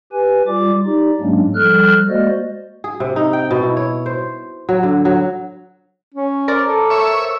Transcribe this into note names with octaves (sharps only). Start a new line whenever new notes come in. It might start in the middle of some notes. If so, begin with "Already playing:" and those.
G4 B4 G#5
G3 F4 D5 D6
D#4 G4 D5
G#2 F#3 G#3 A#3 C#4 D4
F3 G3 A4 F6 F#6
G#3 A#3 F#4 C5 D5 D#5
G#4
C3
D#4
G5
B2
E4
C#5
C5
F#3
D3
F#3
C#4
A#4 C5 D5
A4
C#5 E5